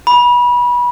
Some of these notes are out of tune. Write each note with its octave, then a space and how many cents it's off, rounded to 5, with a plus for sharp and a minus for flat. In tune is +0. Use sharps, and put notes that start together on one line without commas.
B5 -25